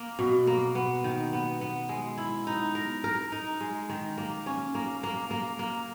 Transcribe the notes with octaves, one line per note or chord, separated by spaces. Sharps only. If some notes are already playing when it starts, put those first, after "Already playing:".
Already playing: A#3
B2
A#3
B3
D#3
B3
B3
G#3
E4
D#4
A#4
A#4
D#4
G#3
D#3
A#3
C#4
A#3
A#3
A#3
A#3